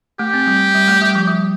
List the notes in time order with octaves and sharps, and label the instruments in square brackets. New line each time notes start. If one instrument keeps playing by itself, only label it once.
[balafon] A3 [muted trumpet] G4
[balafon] C4
G3
G3
A3
G3
F3
G3